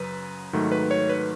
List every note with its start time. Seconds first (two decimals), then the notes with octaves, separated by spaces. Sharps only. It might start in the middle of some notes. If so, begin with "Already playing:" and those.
Already playing: F#2 C#3 F#3 B4
0.53 G#2 D#3 F#3 A3
0.72 B4
0.91 C#5
1.09 B4